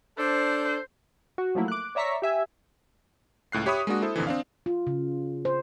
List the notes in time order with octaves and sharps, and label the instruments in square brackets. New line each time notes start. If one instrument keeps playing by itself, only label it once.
[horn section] D4 A4 [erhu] C5
[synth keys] F#4
F3 F#3 A3 A#3 E4
D6 F#6
C#5 D5 E5 A#5 C#6 B6
G4 E5 G#5
[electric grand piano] C#2 A2 F#6 C7
G4 C#5 E5 B5 C#6 D#6
G#3 A#3 D4 F#4
E4 A4 C5
A#1 F2 D3 E3
C4 D4 F5
[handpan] F4
C#3
C5